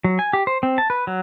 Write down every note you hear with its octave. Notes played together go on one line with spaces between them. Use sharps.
F#3
G#5
G4
C5
C4
A5
B4
F#3